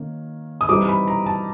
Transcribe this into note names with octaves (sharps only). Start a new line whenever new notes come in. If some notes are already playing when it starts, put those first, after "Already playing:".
Already playing: D#3 A#3 C#4
D#6
E3 G3 C4 D#4 D6
B5
A#5
A5